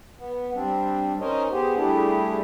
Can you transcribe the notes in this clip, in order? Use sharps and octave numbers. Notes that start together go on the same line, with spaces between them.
B3
G3 C4 D4
C#4 D#4 A#4 C5 C#5 D#5
B3 G4 G#4 C5
G3 A3 D4 E4 G4 G#4